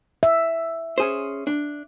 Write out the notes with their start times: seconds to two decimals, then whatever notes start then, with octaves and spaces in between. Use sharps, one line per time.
0.23 E5
0.98 C#4 G#4 C5
1.47 D4